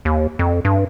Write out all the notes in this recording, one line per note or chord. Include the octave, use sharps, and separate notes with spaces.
D#2
F2
G2